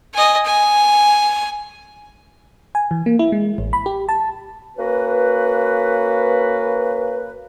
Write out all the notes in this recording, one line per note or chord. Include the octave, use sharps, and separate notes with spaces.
D#5 G#5
G#5
G#5
E3
A#3
E4
G#3
A1
B5
G4
A5
A#3 C#4 F#4 B4